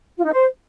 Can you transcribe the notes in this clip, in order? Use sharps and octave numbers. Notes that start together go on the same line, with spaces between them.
F4
D#4
C5